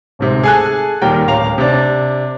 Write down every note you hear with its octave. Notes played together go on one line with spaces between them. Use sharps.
D1 G#2 C3
G#4 A4 G#5 A5 F#6
D#2 A#2 D#3 G3 A#4 G5
D1 C#4 F5 A#5 F7
C3 D4